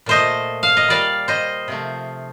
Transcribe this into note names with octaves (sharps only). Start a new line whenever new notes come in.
A#2 A3 C5 D#5
F5
D#5
A#2 G3 D5 F5
C5 D#5
C3 F3 A3